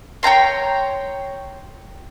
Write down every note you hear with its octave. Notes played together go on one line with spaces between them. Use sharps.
C#5 G5 A#5 C6